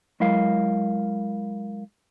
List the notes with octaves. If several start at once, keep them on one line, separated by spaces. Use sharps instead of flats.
F#3 G#3 E4 A#4 F5